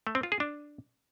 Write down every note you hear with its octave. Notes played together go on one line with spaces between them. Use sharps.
A3
C4
F4
G#4
D4